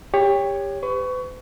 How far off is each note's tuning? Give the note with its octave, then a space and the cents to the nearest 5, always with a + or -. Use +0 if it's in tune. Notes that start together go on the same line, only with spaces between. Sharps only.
G4 +25 C#5 +5
B4 +40 C#6 +20